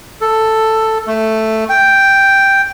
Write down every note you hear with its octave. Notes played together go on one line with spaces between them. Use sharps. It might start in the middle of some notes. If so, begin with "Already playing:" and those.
A4
A3
G5